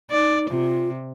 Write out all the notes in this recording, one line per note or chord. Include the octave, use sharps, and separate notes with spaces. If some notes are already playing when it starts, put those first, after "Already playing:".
D#4 D5
C3 F4